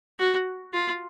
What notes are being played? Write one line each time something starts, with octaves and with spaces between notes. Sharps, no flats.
F#4
F4